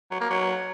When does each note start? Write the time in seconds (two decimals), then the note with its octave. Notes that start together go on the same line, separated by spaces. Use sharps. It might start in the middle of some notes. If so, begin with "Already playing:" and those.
0.11 F#3
0.21 A#3
0.30 F#3